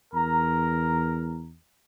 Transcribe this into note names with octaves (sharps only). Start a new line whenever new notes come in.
E2 A#4 A#5